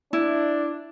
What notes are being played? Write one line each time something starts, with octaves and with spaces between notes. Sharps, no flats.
D4 E4